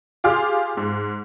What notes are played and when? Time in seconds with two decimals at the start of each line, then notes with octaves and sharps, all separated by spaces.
0.24 F4 G4 G#4 C6 D6 F6
0.77 G#2